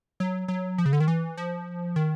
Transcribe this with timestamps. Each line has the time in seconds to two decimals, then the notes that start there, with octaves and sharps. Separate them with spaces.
0.20 F#3
0.48 F#3
0.78 F3
0.86 C#3
0.93 D3
1.00 D#3
1.08 E3
1.37 F3
1.96 D#3